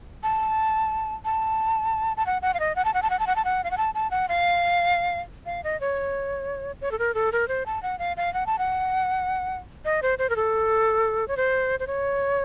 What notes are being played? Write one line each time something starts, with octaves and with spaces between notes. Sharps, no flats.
A5
A5
A5
F#5
F#5
F5
D#5
F#5
A5
F#5
A5
F#5
A5
F#5
A5
F#5
F5
F#5
A5
A5
F#5
F5
F5
D#5
C#5
C#5
A4
A#4
A4
A#4
C5
A5
F#5
F5
F5
F#5
A5
F#5
D#5
C5
C5
A#4
A4
C#5
C5
C5
C#5